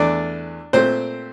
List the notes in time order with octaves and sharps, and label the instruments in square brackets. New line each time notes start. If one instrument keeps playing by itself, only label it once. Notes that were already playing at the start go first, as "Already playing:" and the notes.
Already playing: [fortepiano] E2 E3 A3 D4 D5
A#2 A3 C4 C5